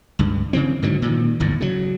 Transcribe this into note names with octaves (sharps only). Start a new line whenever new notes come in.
C#2 G2
C#3 E3 C4
G#2 D3 F#3
A#2 D#3
G1 E2 G#2
C#3 F#3